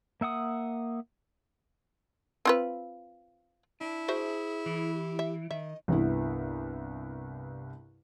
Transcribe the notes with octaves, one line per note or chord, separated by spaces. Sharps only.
A#3 E5 F#5 D#6
C4 F4 B4
D4 E4
F#4 G#4 C5 E5
E3
G4
E5
D#3 D#5 E5
C2 G2 B3 E4